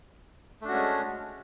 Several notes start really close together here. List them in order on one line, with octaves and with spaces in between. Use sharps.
A3 D4 F#4 C#4 G#3